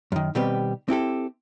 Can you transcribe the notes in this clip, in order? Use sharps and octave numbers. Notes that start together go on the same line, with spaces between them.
F#2 D#3
B2 D#3 G3 C4 G4 B4
C4 E4 G4 A4